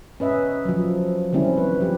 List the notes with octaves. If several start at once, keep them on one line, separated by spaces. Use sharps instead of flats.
C#4 B4 D#5 E5
F3 F#3
D#3 G3 C4 C#4 E4
B4
F3 G4